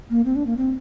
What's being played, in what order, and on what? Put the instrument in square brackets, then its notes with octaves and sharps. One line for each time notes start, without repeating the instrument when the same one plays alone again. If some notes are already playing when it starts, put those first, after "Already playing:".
[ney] A#3
C4
D4
A#3
C4